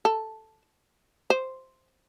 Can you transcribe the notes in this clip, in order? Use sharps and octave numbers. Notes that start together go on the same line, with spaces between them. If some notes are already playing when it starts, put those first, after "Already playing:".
A4
C5